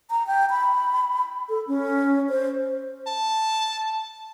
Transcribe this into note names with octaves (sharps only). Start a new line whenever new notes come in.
A#5
G5
B5
A4
C#4
C5
A5